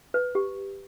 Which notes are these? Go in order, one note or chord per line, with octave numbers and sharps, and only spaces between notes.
B4
G4